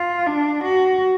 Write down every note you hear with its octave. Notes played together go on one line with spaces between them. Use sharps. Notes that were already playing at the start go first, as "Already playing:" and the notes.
Already playing: F4
D4
F#4